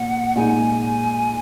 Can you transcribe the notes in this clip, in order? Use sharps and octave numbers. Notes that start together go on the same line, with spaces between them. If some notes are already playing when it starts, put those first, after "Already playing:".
Already playing: A#2 F#5
A#2 G#3 D#4 G#5